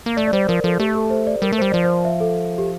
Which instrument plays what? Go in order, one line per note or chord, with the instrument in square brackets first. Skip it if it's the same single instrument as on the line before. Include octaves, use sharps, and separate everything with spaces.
[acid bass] A#3
[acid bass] A3 [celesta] D5
[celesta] D5
[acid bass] G3 [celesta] C5
[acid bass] F3 [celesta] A#4
[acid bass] F3 [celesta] A4
[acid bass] A3 [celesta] G4
[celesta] A4
C5
D5
[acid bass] G3 [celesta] A#4
[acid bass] A3
[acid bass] G3 [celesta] C5
[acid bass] F3 [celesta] D5
[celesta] C5
E5
A4
G4